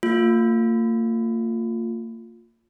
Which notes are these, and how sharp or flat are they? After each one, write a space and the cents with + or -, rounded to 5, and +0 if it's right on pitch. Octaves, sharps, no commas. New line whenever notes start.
A#3 -40 F4 +15